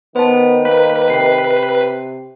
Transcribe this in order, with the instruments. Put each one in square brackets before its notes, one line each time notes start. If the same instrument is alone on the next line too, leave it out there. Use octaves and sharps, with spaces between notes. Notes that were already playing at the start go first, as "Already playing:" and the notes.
[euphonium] D#3 [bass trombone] B3 [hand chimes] C5 A5
[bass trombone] A#3 [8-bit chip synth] B4
[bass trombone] C3 [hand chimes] G5 C7